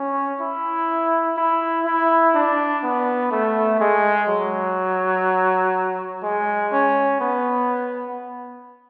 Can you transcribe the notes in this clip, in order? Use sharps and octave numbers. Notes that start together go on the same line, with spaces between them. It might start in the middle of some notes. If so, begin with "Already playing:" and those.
Already playing: C#4
E4
E4
E4
D4
B3
A3
G#3
F#3
G#3
C#4
B3